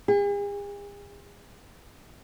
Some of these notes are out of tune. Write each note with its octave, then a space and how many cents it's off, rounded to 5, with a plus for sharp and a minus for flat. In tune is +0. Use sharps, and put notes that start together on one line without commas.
G#4 -45